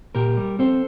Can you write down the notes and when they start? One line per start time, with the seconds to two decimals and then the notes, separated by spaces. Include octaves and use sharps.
0.15 A#2 G4 A#4
0.37 G3
0.59 C4 A4 C5